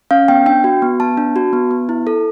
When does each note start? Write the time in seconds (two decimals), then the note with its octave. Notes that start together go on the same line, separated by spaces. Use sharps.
0.11 C#4 F5
0.28 B3 G5
0.46 D4 G5
0.64 F#4
0.82 B3
1.00 B3 A5
1.17 D4
1.36 F#4
1.53 B3
1.71 B3
1.89 E4
2.07 A4